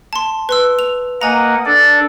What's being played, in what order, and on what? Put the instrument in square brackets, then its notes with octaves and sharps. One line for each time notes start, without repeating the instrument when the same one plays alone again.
[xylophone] A5 C6
B4 C6 E6
F7
[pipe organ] A#3 D#5 F#5 [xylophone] G#5 A#5
[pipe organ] D4 A4 D5